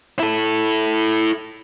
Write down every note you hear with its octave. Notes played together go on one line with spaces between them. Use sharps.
E4 A4